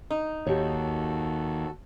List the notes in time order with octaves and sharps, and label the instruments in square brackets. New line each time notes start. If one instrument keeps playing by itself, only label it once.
[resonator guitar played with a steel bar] D#4
[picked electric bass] D#2 [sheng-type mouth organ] F#4 A4 [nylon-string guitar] G4 C#5